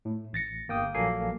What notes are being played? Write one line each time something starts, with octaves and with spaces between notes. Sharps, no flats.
A2
A1 A6 A#6 C#7
G1 A#3 G5 D#6
A#1 F#3 A#3 A4 G#5 C7